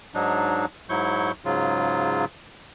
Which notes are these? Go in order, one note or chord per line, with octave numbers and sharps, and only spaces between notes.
G#2 F#3 D4 D#4
G#2 F#3 E4 C#6 G6
G#2 C#3 F#3 F4